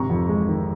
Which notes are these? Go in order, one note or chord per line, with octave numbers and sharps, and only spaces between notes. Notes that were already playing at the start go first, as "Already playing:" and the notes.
Already playing: G#1 C3 A#5 C#6
F2
G#3
D#3